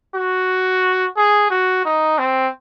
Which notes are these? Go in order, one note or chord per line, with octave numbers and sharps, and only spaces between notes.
F#4
G#4
F#4
D#4
C4